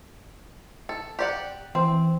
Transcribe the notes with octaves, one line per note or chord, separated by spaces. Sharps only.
A4
G4 D5 F#5
E3 C4